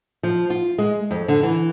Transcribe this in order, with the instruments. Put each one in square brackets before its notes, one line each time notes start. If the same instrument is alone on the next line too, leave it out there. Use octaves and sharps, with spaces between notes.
[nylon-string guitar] F3
F4
G#3
F2
D3
E3